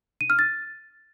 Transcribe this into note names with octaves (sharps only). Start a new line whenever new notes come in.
D#7
F6
A6